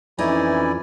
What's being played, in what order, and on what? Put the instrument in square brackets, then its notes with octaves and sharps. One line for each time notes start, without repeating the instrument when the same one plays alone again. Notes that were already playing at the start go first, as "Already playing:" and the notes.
[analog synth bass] F2 [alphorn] E3 [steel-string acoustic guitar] C#4 D#4 [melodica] E4 D5 G#5